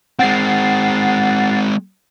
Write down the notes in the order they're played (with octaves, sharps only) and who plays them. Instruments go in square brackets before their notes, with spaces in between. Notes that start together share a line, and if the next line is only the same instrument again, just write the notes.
[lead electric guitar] G#3 C4 [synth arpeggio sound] F#5 A6 C7